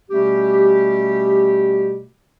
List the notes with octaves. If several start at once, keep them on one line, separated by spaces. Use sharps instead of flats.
B2 G3 A3 C#4 G4